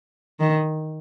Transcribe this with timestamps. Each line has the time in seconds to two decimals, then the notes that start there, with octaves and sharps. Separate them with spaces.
0.40 D#3